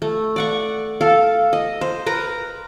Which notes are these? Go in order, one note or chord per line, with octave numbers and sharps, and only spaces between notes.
A3
D5 F#5 C#6
A4 F5
D#5
C5
A#4 B4 A#5